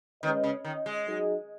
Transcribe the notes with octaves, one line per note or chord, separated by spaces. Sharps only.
D#3 G#3 C#4 B4 D#5
C#3
D#3
G#3
F#3 D#4 G#4